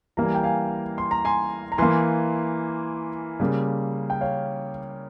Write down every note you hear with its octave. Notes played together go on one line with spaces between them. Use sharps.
E3 G3 A#3 A#5
G#5
G5
F5 G#5
C6
A#5
G#5 C6
A#5
E3 A#3 G#5 C6
C#3 G3 A#3
G5
C#5 F5